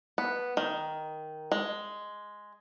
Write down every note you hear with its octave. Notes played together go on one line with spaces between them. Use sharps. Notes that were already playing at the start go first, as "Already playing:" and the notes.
B3
D#3
G#3